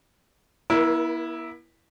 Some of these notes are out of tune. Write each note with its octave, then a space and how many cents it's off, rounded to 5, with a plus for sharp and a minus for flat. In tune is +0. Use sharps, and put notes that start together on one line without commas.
B3 -40 E4 -5 A#4 +25